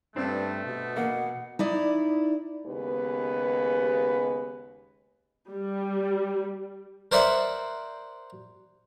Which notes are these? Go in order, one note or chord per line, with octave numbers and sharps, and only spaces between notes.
G2 A3 C4 D4
B2
A#3 F#5
D#4 E4 D5
D#2 C#3 G#3 B3 G4 B4
G3
A#4 C5 D5 E5 F#5